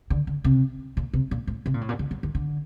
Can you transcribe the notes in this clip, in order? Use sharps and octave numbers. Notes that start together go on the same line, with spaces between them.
D3
D3
C3
A#2
C3
A#2
A2
C3
A#2
A2
A#2
D3
F#3
D#3
D3